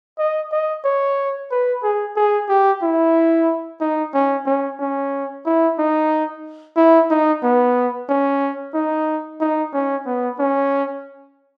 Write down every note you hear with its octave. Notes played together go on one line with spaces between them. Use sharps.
D#5
D#5
C#5
B4
G#4
G#4
G4
E4
D#4
C#4
C#4
C#4
E4
D#4
E4
D#4
B3
C#4
D#4
D#4
C#4
B3
C#4